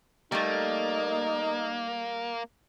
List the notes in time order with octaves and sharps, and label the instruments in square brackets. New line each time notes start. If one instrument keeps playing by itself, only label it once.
[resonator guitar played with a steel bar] G3 A3 [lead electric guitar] A#3 [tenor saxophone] D#4